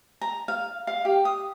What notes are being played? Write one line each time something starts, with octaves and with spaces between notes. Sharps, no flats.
A#5
F5
F5
G4
D#6